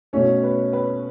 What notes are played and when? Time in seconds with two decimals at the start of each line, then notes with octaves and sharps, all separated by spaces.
0.13 B2 A3 C#4 C#5
0.43 B4
0.73 B4